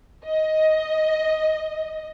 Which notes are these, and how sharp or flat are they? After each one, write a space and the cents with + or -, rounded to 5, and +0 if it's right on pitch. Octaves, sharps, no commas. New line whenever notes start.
D#5 +10